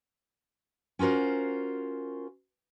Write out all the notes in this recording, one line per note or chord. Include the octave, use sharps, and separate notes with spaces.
C#4 F4 F#4 A#4 C5